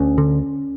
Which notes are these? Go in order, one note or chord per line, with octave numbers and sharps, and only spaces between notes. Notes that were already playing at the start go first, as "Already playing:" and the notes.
Already playing: D2 C#4
D3